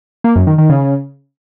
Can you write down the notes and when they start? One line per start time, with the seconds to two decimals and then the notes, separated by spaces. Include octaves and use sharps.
0.24 A#3
0.36 F#2
0.47 D#3
0.58 D#3
0.70 C#3